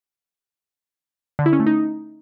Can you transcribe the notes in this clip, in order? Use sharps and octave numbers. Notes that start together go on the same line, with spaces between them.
D3
E4
C#4
A3
D#4